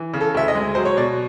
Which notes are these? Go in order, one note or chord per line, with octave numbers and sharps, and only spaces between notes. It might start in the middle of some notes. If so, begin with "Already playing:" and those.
Already playing: E3
C#3
A4
D2 E5
D#5
G#3
F#3 C5
C#5
B2 D5